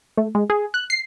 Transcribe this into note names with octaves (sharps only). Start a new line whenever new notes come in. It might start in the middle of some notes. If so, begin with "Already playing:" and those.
A3
G#3
G#4
F#6
C7